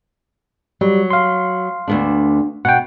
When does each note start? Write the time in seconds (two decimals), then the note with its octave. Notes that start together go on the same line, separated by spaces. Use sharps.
0.81 F#3 G3
1.11 F5 C6
1.88 D2 B3 D4
2.65 B2 F#5 G5